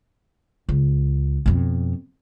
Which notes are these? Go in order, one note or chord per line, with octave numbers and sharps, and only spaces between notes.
C#2
F2 B2